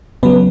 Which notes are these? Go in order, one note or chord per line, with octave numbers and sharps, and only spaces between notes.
C#3 F#3 B3 B4